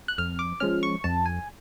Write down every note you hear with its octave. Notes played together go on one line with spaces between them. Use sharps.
F#6
F2 F6
D6
F3 G#3 C#4 F6
C#6
F2 A5
G#5